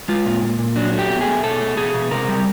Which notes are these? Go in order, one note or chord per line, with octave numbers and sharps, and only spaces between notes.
G#3 F4
A#2
A#2
A#2
F#3 D4
A3
G4
B2
G#4
A3
B2 A4
A3
B2 G#4
B2
C3 A#4
G3